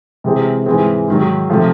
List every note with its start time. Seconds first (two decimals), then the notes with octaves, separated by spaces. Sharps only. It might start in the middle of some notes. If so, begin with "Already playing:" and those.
0.24 C3 E3 G#3 C4
0.66 G#2 E3 G#3 C4
1.08 G#2 D#3 F#3
1.49 C3 F3 A3